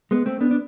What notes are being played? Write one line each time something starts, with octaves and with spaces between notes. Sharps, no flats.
G#3 B3
A3 C4
B3 D4
D4